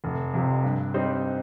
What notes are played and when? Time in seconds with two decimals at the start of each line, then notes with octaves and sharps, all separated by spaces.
0.04 F1
0.34 F2 C3
0.63 G2
0.94 G3 C4 D#4 C5